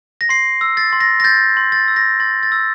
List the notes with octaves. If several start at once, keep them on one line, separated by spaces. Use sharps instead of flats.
A#6
C6 C7
E6
A6
C6
A#6
A#6
G6 A6
C6
A6
E6
A#6
C6 A6
A6
E6